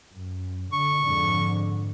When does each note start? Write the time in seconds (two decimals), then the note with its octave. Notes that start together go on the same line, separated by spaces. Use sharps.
0.11 F#2
0.73 D3 C#6
1.03 F2 G#2 D3